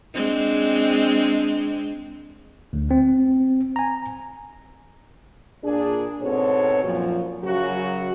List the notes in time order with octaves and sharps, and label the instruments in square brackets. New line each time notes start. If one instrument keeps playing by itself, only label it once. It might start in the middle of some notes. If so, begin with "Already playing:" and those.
[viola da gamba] G#3 C4 D4
[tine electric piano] D2
C4
G#5 A#5
[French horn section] A#2 D4 G#4
G#2 B2 C4 A4 C#5
F#2 A#2 F3
F#2 C#3 F#3 F#4